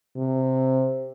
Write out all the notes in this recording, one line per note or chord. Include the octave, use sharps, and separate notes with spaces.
C3